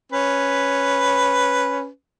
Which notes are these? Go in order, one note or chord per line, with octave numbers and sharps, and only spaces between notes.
C#4 B4